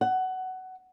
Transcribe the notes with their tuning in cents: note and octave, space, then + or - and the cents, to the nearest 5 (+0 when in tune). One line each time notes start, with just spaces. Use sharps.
F#5 +15